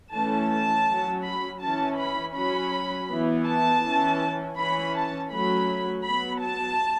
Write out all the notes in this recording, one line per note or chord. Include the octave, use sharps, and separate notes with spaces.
E3 A3 C#4 A5
A5
F#3 C#4
B5
E3 C#4 A5
B5
F#3 C#4 B5
E3 B3
A5
E3 C#4
E3 C#4 B5
A5
F#3 A3 C#4 B5
F#3 B3 B5
A5